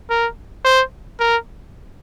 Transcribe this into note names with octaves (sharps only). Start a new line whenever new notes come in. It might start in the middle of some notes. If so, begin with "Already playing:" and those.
A#4
C5
A#4